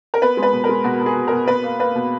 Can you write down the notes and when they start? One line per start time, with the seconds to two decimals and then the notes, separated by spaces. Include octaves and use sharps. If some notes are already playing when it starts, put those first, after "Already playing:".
0.14 A#4
0.22 B3 B4
0.37 G#3
0.43 B4
0.53 B2
0.64 A#4
0.69 G#3
0.84 B2 F#4
1.01 B2
1.06 G#4
1.16 B2
1.28 B2 A#4
1.48 B2 B4
1.64 A#3
1.79 A#3 B4
1.95 B2